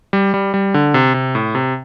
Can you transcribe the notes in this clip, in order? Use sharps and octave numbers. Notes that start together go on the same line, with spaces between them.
G3
G3
G3
D3
C3
C3
A2
C3